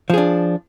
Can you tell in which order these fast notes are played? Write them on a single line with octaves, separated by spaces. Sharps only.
F3 G#4 D4